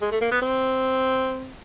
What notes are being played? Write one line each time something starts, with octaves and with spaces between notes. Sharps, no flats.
G#3
A3
A#3
B3
C4